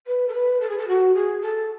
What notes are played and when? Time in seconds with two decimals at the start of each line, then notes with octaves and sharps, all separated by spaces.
0.06 B4
0.28 A4
0.33 B4
0.60 A4
0.69 G#4
0.77 A4
0.87 F#4
1.14 G#4
1.41 A4